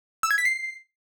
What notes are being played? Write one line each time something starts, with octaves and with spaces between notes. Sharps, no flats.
E6
G#6
B6
C7